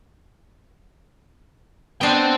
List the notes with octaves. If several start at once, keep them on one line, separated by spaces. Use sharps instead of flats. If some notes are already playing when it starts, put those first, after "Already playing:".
B3 D4 C5 G5